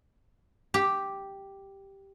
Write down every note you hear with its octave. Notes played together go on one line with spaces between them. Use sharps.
G4